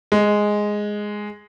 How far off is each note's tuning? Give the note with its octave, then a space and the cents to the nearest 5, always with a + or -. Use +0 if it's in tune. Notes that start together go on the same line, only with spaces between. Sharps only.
G#3 +0